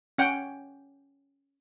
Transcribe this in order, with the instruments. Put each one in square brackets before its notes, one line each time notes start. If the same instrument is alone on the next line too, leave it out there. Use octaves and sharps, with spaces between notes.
[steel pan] C#4 F#5 G5